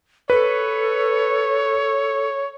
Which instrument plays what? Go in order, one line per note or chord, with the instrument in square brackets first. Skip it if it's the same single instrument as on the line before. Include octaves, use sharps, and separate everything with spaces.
[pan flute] A4 [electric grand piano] B4 [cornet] C#5